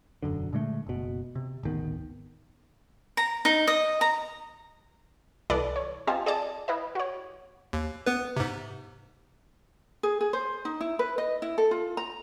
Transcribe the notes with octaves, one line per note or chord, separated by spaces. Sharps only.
E1 B1 F#2 D3
A#2 D3 G#3 A3
F#1 B2
C3
D1 G#1 D#3 B3
A#5
D#4
D#5
A#5
C2 E3 A4 B4 D5
C#5
C4 F4 G4 D#5 G#5 A5
G#4 D5 D#5 A5
E4 B4 D#5
F#4 C#5
D#2
B3 B4
G#2 C3
G#4
G#4
C5
D#4
E4
B4
D#5
E4
A4
F4
A#5